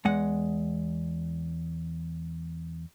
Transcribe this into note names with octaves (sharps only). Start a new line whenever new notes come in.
E2 G#3 F#5